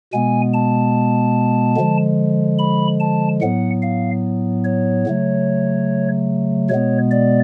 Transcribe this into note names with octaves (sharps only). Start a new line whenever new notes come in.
B2 G#3 B3 G#5
A5
D3 F3 G#3
B5
A5
A2 F#3 B3 F#5
F5
C#5
C#3 F#3 A3
B2 G#3 B3 C#5
D5